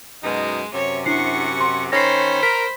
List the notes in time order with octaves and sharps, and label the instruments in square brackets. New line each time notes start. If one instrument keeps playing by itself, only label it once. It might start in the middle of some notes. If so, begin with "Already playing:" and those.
[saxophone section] F#2 B2 D#4 [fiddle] G#3
[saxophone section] F#2 C3 [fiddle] C#5
[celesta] D4 E4 C7 [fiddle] F#5 C#6
[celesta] C6
[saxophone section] D#3 C#4 [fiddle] C5 B5 [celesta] A#6 C7
[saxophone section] A#4 [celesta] B6